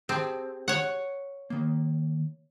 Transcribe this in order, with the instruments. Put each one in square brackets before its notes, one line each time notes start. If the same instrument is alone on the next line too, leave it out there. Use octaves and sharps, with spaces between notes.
[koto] C4 [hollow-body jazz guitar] G4 G#4 A5
[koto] C#5 F#5
[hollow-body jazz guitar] D#3 A#3